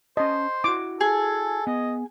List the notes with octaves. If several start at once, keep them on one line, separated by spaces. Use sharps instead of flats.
C#4 C5 D#5 A5
E4 F#4 D6
G#4 A4
B3 D#5